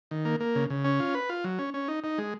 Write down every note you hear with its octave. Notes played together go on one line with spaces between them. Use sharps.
D#3
A#3
A#3
C#3
C#3
C#4
F4
B4
F4
F#3
C#4
C#4
D#4
D#4
G#3